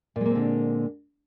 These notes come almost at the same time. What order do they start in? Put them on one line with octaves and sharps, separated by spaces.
A#2 G#3 A#3 C4 D3